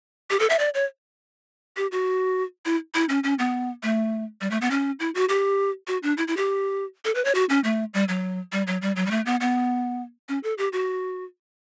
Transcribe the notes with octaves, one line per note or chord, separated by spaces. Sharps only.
G4
A4
E5
D5
C#5
G4
F#4
E4
E4
C#4
C#4
B3
A3
G3
A3
B3
C#4
E4
F#4
G4
F#4
D4
E4
E4
G4
A4
B4
C#5
F#4
C#4
A3
G3
F#3
G3
F#3
G3
F#3
G3
A3
B3
B3
C#4
A4
G4
F#4